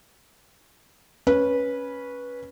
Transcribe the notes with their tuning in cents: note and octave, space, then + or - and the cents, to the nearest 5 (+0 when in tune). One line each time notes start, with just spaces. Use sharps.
C#4 +0 B4 -15